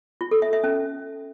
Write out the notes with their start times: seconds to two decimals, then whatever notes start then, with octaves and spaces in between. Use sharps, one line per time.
0.21 F4
0.31 A4
0.42 E5
0.53 E5
0.64 C#4